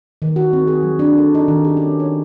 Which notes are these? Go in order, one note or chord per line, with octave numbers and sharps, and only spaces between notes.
D#3
F#4
C4
G#4
F#3
D4
A4
D#4
D#3
G4
C#4
C#5